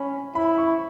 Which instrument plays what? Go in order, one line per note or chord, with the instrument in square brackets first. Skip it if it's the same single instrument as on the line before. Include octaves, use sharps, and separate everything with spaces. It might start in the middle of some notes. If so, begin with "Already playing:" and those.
Already playing: [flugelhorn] C#4 [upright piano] B5
[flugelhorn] E4 [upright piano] B5
[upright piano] C#6